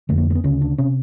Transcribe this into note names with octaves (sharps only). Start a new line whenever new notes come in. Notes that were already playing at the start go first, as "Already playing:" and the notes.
F2 D3 A3
A#3
A#3
B3
D2 C#3 C#4
D4
C3 C#4